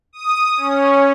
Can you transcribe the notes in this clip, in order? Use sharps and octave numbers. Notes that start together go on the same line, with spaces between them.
D#6
C#4